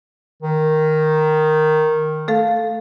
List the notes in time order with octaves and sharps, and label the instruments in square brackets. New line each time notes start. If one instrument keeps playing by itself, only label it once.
[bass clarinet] D#3
[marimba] A3 A4 F5